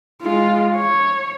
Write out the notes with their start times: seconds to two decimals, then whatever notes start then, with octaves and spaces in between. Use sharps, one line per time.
0.23 G#3 F4
0.77 C#5